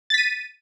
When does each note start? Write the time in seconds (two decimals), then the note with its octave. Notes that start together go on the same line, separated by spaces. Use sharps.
0.10 A6
0.14 B6
0.18 D#7